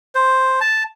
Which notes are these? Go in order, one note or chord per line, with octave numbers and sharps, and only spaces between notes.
C5
A5